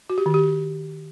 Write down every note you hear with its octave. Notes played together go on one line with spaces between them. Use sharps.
F#4
G4
D#3
G4